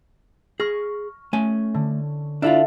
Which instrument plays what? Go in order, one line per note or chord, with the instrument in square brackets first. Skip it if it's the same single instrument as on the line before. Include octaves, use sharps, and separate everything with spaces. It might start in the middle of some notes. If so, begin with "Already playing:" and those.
[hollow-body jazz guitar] G#4 [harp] C#6 F6 A#6
[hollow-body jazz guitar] A3 G#5 [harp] C#4
[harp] D3
[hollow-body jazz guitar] D4 E4 F4 [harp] A4 E5 F5